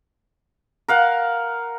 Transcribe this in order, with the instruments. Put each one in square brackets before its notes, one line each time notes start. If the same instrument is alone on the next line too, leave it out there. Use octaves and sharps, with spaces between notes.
[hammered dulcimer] A#4 F5 F#5